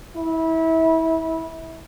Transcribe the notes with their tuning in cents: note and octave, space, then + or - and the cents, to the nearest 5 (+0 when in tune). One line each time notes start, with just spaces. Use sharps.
E4 -25